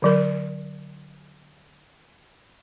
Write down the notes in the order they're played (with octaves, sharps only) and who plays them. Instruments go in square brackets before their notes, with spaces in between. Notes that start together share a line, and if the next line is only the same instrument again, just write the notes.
[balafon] D3 F#3 A#4